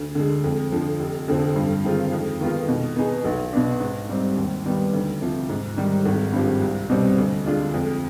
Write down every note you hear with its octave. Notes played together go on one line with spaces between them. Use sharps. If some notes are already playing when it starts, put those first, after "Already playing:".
Already playing: D2
D3 G#3
F2
D3 F3
F1
F2 D3 F3 C4
G2
D#3 G#3 C4 F4
F2
D#3 G#3 B3 F4
B2
B3 D#4 G#4
B1
B2 B3 D4
G#2
G3 C4
D#2
D#3 G3 B3
D2
C3 F3
G#2
D#3 G3
G#1
G2 F3 C4 G4
C2
B2 G3 C4
D2
D3 G#3 D4 F4
F2